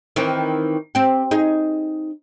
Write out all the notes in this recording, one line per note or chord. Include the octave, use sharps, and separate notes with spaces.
D#3 E3 C4
C4 G4
D#4 G#4